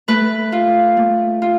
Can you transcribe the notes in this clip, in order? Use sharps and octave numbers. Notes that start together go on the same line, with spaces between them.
A3 B4
F4
A3
F4